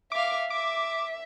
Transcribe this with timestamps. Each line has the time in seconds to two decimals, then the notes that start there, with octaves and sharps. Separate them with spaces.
0.12 E5 F5 D6
0.50 E5 D6